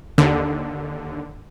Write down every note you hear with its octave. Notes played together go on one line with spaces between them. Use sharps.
D#2 D3